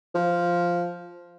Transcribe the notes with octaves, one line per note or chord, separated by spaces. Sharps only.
F3